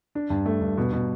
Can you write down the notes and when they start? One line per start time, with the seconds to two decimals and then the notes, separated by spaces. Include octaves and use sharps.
0.15 D4
0.30 G2
0.46 A3
0.61 G2
0.78 B2
0.93 B2